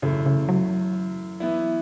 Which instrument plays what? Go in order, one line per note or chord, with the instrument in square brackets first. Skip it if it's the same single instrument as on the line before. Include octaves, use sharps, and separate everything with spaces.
[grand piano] F#2 E3 A3 E4 A4 [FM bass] C#3
[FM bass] C#3
F#3
[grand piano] E3 B3 E4